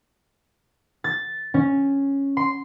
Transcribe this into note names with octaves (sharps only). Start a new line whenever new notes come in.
A6
C#4
C6